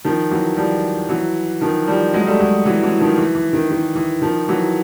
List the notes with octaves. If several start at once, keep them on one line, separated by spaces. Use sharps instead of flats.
D#3 F3
E3 F#3
F3 G3
E3 F#3
D#3 F3
F3 G3
F#3 G#3
G3 A3
F#3 G#3
E3 F#3
E3 F#3
D#3 F3
E3
E3
D#3
D#3
E3
D#3 F3
E3 F#3